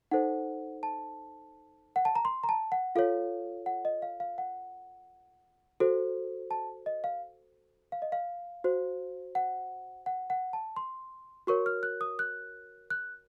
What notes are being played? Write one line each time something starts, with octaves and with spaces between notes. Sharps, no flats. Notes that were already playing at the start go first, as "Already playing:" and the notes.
D#4 A4 C5 F#5
A5
F#5
A5
A#5
C6
A#5
A5
F#5
F4 A4 C#5 F5
F#5
D#5
F5
F5
F#5
F#4 A4 C5
A5
D#5
F5
F5
D#5
F5
F#4 C5
F#5
F#5
F#5
A5
C6
F#4 A#4 C#5 C#6
F6
F#6
D#6
F#6
F#6